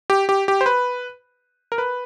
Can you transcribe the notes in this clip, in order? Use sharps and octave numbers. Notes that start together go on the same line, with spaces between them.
G4
G4
G4
C5
B4
A#4
B4